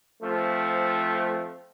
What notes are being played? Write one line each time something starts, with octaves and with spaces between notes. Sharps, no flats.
F3 A3 C4